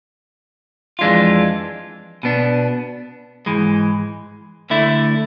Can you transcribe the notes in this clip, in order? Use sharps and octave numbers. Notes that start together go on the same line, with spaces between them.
F2 E3 G#3 D4 F4
B2 B3 D4
G#2 E3 G#3
D2 D3 A3 E4